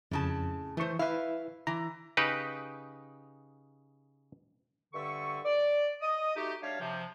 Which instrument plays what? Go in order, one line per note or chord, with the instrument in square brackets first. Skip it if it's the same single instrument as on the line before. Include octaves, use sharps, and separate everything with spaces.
[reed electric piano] F2 [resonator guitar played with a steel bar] A2 C#3 A5
[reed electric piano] E3 C#6 [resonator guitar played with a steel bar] A3 C5
[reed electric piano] E4 B4 [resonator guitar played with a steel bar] E5 F5
[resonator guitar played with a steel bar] E3 [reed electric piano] A#5
[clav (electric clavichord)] C#3 D#4 G4 B4
[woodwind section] G2 D3 E5 C#6
D5
D#5 D#6
A3 D#4 F#4 G4
G3 D4 C#5 E5 F5
C3 F3